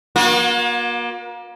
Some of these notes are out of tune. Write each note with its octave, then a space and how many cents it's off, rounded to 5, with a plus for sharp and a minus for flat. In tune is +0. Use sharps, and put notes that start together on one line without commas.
A#3 +30 F#4 -40